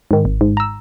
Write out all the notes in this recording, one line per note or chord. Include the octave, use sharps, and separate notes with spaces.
G#2 D#3
G#1
G#2
A#5 E6